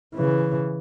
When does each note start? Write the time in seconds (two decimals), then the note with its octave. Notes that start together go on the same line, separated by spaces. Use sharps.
0.15 C#3 E3